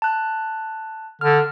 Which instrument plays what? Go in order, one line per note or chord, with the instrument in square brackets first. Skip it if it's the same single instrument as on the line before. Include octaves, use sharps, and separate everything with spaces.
[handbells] A5 F#6
[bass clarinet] D3 [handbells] F6